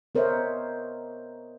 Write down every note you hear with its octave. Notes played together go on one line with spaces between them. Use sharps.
B3 A#4 C5 C#5 D#5 E5